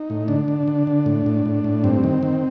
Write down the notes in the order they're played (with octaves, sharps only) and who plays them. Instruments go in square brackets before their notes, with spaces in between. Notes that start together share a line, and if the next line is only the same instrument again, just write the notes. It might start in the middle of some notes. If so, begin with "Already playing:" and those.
Already playing: [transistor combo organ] D#4
A2
D3 D4
D3
D3
D3
A2
A2
A2
A2
G2 C4
D#3
D#3